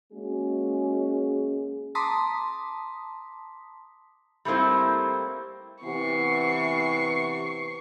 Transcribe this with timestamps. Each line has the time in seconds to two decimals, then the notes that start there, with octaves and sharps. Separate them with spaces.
0.12 G#3 A#3 C#4 F#4 G#4
1.95 A5 A#5 C6 D6 D#6 B6
4.45 G3 A3 A#3 C4 E4
5.84 C3 E3 B3 C#6 C7